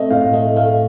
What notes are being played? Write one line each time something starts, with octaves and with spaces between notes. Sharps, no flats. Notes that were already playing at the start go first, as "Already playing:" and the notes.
Already playing: A3 C4 D#5
A2 F5
A3 D#5
A3 F5